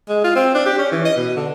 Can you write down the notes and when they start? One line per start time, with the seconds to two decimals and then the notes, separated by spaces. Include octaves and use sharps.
0.09 G#3
0.24 F4
0.36 C4
0.55 D4
0.66 G4
0.79 C#4
0.92 E3
1.05 D#5
1.16 B2
1.36 D3